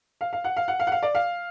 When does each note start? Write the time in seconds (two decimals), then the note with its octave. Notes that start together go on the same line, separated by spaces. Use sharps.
0.21 F5
0.33 F5
0.44 F#5
0.57 F5
0.68 F#5
0.80 F5
0.87 F#5
0.92 F5
1.03 D5
1.15 F5